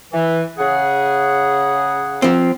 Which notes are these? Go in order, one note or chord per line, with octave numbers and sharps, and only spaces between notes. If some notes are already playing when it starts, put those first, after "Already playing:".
E3
C#3 G#4 F#5
F3 C4